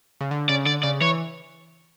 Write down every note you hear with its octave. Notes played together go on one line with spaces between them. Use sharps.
C#3
D3
C#3 D5
D3 D5
C#3 D5
E3 C#5